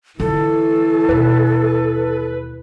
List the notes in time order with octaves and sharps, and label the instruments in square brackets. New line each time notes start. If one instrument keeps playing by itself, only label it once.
[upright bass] D3 F4 [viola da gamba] E3 [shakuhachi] A4
[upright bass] D#2 B2 [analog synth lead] B4